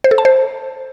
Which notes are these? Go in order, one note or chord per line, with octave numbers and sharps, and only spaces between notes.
C5
A4
A5
C5